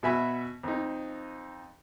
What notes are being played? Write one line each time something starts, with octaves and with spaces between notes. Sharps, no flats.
B2 F#4 E5 G#5 B5
F2 D#4